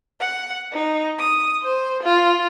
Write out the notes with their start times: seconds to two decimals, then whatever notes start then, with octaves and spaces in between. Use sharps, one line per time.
0.20 F#5
0.73 D#4
1.17 D#6
1.62 C5
2.02 F4